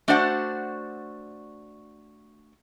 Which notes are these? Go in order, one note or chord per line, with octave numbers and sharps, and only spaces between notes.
A3 D4 F#4 C5 D5 F#5